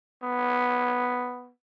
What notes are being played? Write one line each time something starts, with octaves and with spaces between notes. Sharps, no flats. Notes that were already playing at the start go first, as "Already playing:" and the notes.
B3